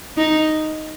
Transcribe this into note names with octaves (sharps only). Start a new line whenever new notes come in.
D#4